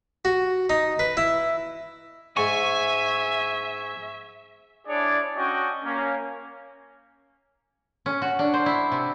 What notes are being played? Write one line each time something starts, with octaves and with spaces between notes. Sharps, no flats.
F#4
D#4
B4
E4
G#2 E5 G#5 C#6
D4 E4 G#4 C#5 D5
C#4 D4 F#4 D#5 G5 C#6
A#3 C#4
C#4
F#4
D4
C5
E4
C3